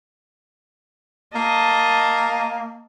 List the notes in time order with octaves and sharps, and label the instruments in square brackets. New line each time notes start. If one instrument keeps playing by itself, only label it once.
[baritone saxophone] A#3 [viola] D#5 A5